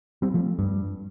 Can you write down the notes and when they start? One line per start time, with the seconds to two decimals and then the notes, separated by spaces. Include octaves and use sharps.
0.22 G3 C4
0.34 F3 A3
0.59 G2